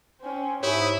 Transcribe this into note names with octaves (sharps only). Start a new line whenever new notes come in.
C4 C#4
G#2 E4 G4 C#5 E5 D#6